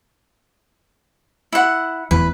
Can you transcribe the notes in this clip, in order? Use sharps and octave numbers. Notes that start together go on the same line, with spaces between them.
E4 F#5
F1 E2 E3 B4